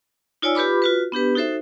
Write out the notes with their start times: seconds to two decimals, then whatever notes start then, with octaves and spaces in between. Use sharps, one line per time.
0.42 D#4 F4 C#5 D5 G#5 E6
0.55 F4 G4 B4 B5 D6
0.82 F4 F#4 B4
1.12 B3 D4 G4 B4
1.35 D#4 F#4 A4 C5 E5